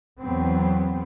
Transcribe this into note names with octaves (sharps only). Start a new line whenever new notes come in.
E2 F#3 B3 C4